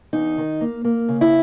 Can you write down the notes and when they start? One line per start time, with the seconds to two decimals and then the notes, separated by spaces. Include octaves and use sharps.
0.13 E2 D#4
0.38 D#3
0.61 A#3
0.85 A#3
1.09 C#3
1.21 E4